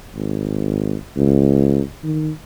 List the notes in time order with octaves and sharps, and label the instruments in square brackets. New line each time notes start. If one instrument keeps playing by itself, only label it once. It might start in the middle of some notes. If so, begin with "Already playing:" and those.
[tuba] G#1
C#2
D#3